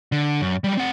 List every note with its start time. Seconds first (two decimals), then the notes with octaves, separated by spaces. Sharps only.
0.12 D3
0.41 F#2
0.64 F#3 G3
0.77 C4 F#5